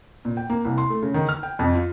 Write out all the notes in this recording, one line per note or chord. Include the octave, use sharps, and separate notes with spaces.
A#2
G5
A#3
C2
C6
A3
C#3
D#3
F6
G5
F2
F4